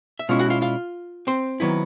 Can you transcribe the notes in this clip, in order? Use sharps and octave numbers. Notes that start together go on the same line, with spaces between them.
E5
B2 G#3 C#4 E4 F4 F5
F#4 F#5
F4 F5
F4 F5
C4 C5
D#3 F#3 B3 E4